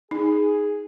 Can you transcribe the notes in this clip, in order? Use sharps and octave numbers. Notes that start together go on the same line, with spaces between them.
D#4 G#4